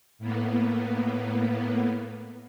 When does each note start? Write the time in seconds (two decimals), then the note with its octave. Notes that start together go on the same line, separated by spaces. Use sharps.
0.19 A2 A#3 B3